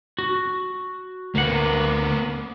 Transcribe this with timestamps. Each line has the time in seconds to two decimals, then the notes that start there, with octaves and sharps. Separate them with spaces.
0.19 F#4
1.35 D2 A#3 B3 F#5